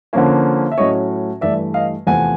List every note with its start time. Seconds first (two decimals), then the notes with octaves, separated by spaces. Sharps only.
0.13 D3 F3 A#3 C#4
0.72 E5
0.78 A2 F#3 A3 C#4 C#5 D#5
1.41 G2 E3 A3 D5 E5
1.74 D#5 F5
2.07 E2 C3 F3 A3 C4 F#5 G#5